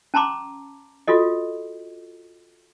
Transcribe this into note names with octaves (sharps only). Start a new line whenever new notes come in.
C#4 A5 A#5 C6 D6
F4 F#4 A4 D#5